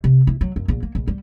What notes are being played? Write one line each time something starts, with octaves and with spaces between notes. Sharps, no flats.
C3
E4
F#3
F#2
A#1
A#3
A#1
G3